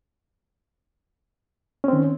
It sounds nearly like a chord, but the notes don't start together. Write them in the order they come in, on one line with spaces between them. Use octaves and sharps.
C#4 C4 D#3